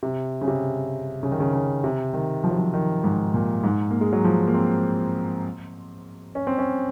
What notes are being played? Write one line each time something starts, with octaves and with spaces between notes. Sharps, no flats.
C3
C#3
C3
C#3
D#3
C#3
C#3
C3
D#3
F3
F#3
F3
D#3
G#2
A#2
G#2
A#3
G#3
F#3
F3
A#3
C4
C#4
C4
C#4